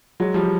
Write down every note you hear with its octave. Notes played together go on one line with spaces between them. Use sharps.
F#3 G#3
F3 G3